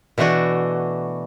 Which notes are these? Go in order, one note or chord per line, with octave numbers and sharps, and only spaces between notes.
B2 E3 A3 D4 F#4